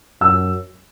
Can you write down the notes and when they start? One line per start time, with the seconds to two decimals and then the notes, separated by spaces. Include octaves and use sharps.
0.21 F#2 E6